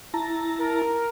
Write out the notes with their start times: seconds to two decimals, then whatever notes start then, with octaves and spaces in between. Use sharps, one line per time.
0.14 E4 A5 A#5
0.59 A#4